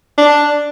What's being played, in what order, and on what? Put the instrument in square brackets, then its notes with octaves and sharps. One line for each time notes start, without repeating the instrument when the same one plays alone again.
[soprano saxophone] D4